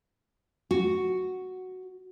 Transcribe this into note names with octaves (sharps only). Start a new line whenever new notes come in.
F#4